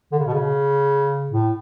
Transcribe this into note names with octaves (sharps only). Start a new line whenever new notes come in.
D3
C#3
B2
C#3
A2